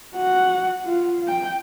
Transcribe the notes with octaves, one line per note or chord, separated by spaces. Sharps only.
F#4 F#5
F4
G5